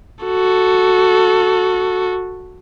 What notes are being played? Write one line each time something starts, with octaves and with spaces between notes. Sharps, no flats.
F#4 A4